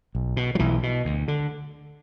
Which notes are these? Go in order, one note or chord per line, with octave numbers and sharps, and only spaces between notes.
B1
B2
F#3
B1 E3
B2
D2
D3